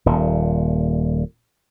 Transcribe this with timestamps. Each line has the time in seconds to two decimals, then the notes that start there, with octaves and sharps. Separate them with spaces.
0.06 D#1 A#2